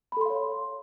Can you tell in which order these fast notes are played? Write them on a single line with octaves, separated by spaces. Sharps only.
B5 A4 C6 F5 C#5